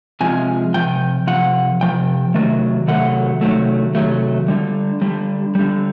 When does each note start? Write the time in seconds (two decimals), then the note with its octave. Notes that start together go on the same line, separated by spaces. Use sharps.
0.21 C3 F3 G#3 G#5
0.74 C3 F3 G5
1.27 C3 F3 F#5
1.81 C3 F3 G5
2.34 C3 D#3 F#3 A3
2.88 C3 D#3 F#3 A3 F#5
3.41 C3 D#3 F#3 A3
3.95 C3 D#3 F#3 A3
4.48 D3 G3
5.02 D3 G3
5.55 D3 G3